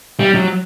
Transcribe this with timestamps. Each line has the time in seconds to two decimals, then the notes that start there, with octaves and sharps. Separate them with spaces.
0.20 G3
0.35 F#3